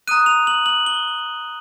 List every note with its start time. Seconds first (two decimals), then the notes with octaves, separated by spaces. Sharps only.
0.07 A#5 D#6 F#6 D#7
0.26 F7
0.47 F#7
0.66 F#7
0.86 G7